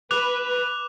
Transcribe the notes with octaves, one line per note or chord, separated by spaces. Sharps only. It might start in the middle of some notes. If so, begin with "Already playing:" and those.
B4 D6 F#6 F7